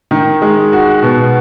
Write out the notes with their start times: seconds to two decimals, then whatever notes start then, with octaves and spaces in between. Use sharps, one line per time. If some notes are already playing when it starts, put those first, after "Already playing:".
0.11 D#3
0.42 G#3
0.73 F#4
1.03 B2